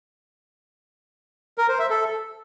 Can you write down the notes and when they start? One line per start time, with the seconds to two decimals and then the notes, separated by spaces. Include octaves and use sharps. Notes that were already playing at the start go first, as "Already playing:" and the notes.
1.58 A#4
1.69 C5
1.79 E5
1.90 A4